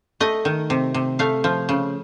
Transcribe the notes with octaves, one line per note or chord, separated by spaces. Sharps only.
A3 D#5
D#3
C3
C3
A3 F5
F3
C#3